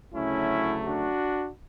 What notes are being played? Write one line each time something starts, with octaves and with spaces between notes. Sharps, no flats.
D2 C#3 F#3 A3 C#4 E4
D4 F#4